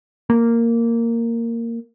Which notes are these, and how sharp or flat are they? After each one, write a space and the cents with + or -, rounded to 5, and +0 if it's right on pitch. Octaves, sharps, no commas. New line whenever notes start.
A#3 -10